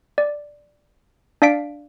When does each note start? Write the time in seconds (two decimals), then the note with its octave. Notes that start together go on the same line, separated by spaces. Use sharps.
0.18 D5
1.42 D4 D5 F5 B6 D7